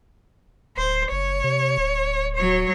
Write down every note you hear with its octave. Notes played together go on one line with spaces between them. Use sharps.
D1 C5
F#1 C#5
C3
D1
F#3 C#5